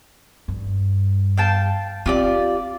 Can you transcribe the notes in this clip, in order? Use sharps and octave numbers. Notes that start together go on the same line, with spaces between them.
G2
F5 G5 A5
C4 F4 G4 D5